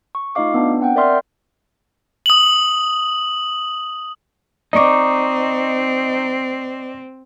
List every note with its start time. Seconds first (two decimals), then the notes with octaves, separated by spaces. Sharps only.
0.15 C#6
0.35 A3 D#4 F4 D#5 F5 D6
0.54 B3 D4
0.80 C4 F#5 G5
0.95 A#4 D5 E5 C6 F6 G6
2.26 D#6 F#7
4.73 C4 D#4 D5 D#5 C#6 D6